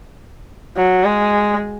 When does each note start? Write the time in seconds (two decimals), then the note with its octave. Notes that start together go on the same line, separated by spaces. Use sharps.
0.76 F#3
1.05 G#3